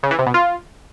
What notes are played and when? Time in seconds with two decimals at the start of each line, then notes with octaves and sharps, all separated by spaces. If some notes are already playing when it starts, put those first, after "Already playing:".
0.03 C#3
0.11 E3
0.19 C3
0.26 B2
0.34 F4